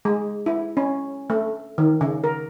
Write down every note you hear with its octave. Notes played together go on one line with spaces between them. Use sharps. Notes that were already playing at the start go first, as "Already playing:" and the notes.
G#3
E4
C#4
A3
D#3
C#3
A#4